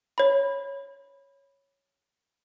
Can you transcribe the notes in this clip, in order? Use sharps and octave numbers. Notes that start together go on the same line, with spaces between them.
C#5 B5